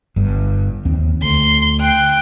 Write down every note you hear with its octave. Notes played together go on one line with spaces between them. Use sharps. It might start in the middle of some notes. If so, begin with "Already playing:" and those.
G1 G2
D#2 C4
D2 C6
G5 F#6